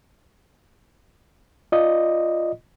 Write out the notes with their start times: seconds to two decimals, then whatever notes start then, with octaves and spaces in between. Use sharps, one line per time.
1.72 F4 D5 D#5